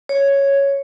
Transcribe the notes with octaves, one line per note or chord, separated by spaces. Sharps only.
C#5